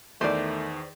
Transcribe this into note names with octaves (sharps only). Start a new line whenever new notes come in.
E2 D#3 A3 C5 D5